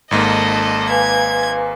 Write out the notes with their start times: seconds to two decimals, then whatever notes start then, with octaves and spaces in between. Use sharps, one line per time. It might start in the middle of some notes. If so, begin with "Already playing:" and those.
0.11 G#1 G#2 A#3 A4 D#5
0.89 B4 F5 G#5 G#6